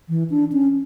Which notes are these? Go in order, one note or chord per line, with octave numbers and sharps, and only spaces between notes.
E3
D4
C#4